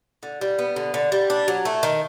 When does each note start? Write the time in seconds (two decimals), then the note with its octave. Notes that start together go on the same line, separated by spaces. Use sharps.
0.23 D3
0.41 G3
0.59 B3
0.76 D3
0.94 D3
1.12 G3
1.30 D4
1.48 F#3
1.65 A3
1.83 D#3